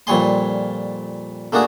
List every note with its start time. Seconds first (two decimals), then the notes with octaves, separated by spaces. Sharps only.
0.07 F2 A#2 G3 C#5 G#5 C6
1.52 A3 A#3 D4 F#4 G#4